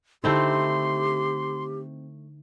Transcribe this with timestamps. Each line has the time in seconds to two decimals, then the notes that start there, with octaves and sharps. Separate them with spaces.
0.24 D3 A3 C4 D#4 E4 G4 C6